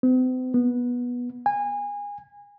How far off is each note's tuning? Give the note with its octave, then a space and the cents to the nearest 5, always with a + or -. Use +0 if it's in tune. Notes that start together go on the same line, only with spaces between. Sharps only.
C4 -45
B3 -15
G#5 -25